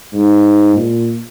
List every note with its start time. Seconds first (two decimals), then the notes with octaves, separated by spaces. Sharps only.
0.13 G#2
0.76 A#2